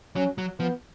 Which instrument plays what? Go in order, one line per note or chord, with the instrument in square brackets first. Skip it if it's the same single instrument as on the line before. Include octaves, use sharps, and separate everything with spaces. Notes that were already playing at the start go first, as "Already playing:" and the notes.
[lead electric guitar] F#3 [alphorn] C#4
[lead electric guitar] F#3
[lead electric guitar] F3 [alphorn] B3